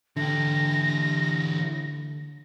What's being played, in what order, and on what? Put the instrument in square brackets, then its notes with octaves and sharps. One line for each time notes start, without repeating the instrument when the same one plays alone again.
[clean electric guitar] D3 [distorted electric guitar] E3 G4 [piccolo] A#6